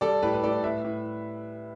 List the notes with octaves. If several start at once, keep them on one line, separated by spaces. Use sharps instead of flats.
G3 A4 D5
A2 G4 B4
B4
A2 A4 D5
A2 B4 E5
A2